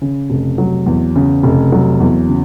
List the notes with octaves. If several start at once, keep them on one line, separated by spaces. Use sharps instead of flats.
C#3
F1
F#3
E2
C#3
F1
F#3
E2
C#3